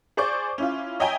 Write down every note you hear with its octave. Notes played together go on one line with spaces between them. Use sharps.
G#4 C5 D5 C#6 D6 G6
C#4 E4 F4
C#5 D#5 E5 G5 G#5 A#5